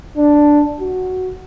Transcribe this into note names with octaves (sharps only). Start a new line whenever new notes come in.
D4
F#4